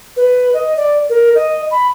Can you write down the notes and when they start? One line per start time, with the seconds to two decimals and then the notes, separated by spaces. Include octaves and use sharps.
0.17 B4
0.54 D#5
0.77 D5
1.10 A#4
1.35 D#5
1.71 B5